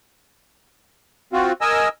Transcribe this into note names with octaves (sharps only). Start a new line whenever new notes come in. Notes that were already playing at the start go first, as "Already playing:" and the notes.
C4 F4 F#4
A#4 D#5 G#5 E6